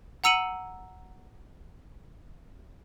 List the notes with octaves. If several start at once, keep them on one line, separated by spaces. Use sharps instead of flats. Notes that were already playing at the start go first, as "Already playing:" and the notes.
F#5 A#5 E6 C#7 D#7 F#7